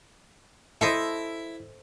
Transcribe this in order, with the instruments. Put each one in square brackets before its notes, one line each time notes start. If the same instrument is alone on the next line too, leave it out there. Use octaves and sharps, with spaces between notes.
[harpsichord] E4 [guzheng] A4 C5 D#5